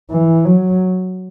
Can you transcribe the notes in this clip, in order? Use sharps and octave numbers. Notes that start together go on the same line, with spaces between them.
E3
F#3